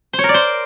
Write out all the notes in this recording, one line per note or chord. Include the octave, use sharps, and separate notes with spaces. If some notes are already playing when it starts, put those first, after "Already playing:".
C5
C#5
A#4
D5
C5